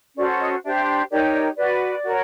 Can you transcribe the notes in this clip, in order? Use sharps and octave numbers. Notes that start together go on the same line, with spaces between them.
C#4 F#4 A4 C5 D5
D#5
D4 G4 C5 E5
D#4 G4 A#4 C#5 D5
D5
F#4 B4 D5
F#4 A#4 C#5